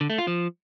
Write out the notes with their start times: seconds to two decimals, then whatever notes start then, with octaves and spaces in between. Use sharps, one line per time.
0.01 D3
0.10 A3
0.18 F4
0.27 F3